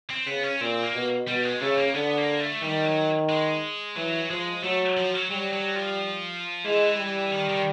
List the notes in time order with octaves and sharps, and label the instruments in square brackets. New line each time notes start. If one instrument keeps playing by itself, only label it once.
[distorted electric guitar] C4
[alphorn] C#3 [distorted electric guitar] B3
[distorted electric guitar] C#4
[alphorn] A#2 [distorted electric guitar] C4
[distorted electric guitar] A#3
[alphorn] B2
[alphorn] B2 [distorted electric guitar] G3
[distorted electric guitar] G#3
[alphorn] C#3 [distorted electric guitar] A3
[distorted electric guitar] A#3
[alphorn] D3 [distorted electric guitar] B3
[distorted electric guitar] A#3
A3
[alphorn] D#3 [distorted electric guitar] G3
[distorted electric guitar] F#3
G#3
[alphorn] E3 [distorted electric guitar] F#3
[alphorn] F3 [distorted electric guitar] G#3
[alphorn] F#3 [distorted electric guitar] A3
[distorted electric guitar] F3
F#3
[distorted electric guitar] F#3 [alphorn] G3
[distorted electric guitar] F#3
F3
[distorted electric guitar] E3 [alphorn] G#3
[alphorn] G3
[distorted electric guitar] D#3
D#3